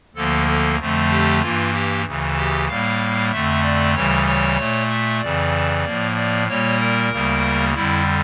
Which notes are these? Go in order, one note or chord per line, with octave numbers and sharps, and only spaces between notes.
D2 D3 F3 A#3 A4
A4
F2 D3 F3 A3
G4
G2 E3 A#3 F4
G4
D2 C#3 E3
G4
A2 G3 A#3 F5
F2 D3 A3 E5
D5
D2 C#3 E3 G3 C#5
C#5
A#2 A3
E5
F2 C#3 E3 D5
A2 F3 A#3
D5
A#2 G3 A#3 C#5
A#4
D2 C#3 G3 A#3
F2 D3 G3 E4